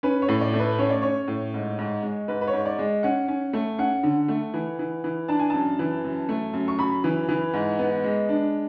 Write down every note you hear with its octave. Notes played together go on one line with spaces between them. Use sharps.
C#4 B4
C#5
A2
D5
A3
B4
C#4 C#5
D5
C#4 C#5
A2
G#2
G#2
G#3
G#2 B4
B4
C#5
G#2
D5
G#3
C#4 F#5
C#4
A3
C#4 F#5
D3
A3
E3
E3
E3
D4 A5
G#5
F#2 A5
E3
F#2
A3
F#2
C#6
F#2 B5
E3
E3
G#2
B3
G#3
D4